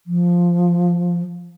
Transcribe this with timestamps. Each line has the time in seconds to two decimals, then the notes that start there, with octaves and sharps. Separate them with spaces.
0.07 F3